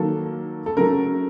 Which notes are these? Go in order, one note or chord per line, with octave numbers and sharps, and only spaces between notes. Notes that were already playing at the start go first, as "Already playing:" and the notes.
Already playing: D#3 F#3 A#3 A4
A4
C#3 F#3 A3 A#4